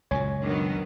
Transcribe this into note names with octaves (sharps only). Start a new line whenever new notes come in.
C#2 F#2 A#2 C#5 G#5
D#3 F#3 B3 D4